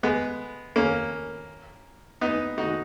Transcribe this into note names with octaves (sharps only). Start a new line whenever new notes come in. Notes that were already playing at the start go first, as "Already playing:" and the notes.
G#3 B3
A#3 C#4
B3 D#4
D#4 F#4